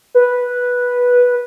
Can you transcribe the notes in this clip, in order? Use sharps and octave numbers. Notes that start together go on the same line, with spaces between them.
B4